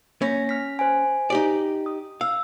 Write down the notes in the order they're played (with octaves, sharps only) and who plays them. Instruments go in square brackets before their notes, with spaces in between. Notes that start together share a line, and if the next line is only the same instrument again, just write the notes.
[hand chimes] A#3 A#6 [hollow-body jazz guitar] C#4
[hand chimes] F6 B6
C5 G#5
[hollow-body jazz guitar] D#4 G4 D5
[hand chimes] D#6
[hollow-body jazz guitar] F5 [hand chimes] E6